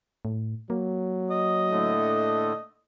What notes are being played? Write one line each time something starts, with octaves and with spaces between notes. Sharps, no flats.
A2
F#3 A#3
D#5
A2 D3 A3